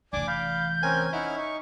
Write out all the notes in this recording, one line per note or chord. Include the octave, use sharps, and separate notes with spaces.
F1 E3 D4 D5 G#5 D6
F5 B5 G6
C4 C#4 A#4 G#5
C#4 D#4 E4 F#5 F6
D#4 C#6